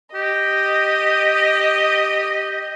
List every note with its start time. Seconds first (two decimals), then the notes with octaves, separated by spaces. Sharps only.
0.14 G4 D#5